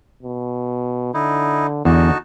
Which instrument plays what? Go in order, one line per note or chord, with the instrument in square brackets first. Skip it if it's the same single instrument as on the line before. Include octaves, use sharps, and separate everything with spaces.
[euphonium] B2
[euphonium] D3 [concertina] D#4 E4
[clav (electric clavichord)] E2 [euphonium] D3 [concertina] D#4 F#4 A5